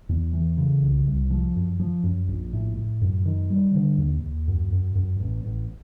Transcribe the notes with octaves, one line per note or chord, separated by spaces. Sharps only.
E2
E3
C#3
C2
C2
F3
F#2
F3
F#2
A#1
A2
A2
F#2
D#3
G3
D3
D#2
D#2
F#2
F#2
F#2
A1
A1